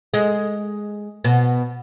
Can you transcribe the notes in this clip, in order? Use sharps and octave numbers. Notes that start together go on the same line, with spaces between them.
G#3
B2